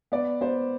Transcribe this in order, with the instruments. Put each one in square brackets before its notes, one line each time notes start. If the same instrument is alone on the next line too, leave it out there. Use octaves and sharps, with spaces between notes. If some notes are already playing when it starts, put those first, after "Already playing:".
[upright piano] B3 D5
B3 C5